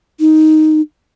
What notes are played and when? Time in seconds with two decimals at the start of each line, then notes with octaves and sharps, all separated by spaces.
0.20 D#4